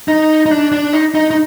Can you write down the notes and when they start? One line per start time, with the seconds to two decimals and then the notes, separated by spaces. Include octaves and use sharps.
0.08 D#4
0.46 D#4
0.51 D4
0.72 D4
0.93 D#4
1.15 D#4
1.31 D#4